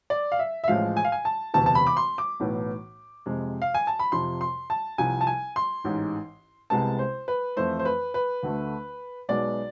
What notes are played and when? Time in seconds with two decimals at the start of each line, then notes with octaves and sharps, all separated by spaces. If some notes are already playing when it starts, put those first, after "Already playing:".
0.10 D5
0.32 F5
0.39 E5
0.64 E5
0.68 A1 A2 F3 G#3 F5
0.97 G#5
1.05 F5
1.12 G#5
1.25 A5
1.54 E1 D2 C3 E3 A5
1.66 A5
1.75 B5
1.87 D6
1.97 C6
2.18 D6
2.40 B1 A2 E3 B3
3.26 F2 C3 G#3
3.62 F5
3.74 G#5
3.87 A5
3.99 B5
4.12 F2 C3 F3 C6
4.41 C6
4.70 A5
4.98 C2 C3 F3 G#5
5.21 A5
5.27 G#5
5.56 C6
5.84 A1 G#2 G#3
6.70 C2 C3 G#3 B3 A5
6.99 C5
7.28 B4
7.56 F2 E3 A3 C5
7.79 C5
7.85 B4
8.14 B4
8.43 D2 D3 A3
9.29 B1 B2 G#3 B3 D5